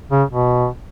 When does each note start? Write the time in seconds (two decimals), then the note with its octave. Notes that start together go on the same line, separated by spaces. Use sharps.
0.10 C#3
0.29 B2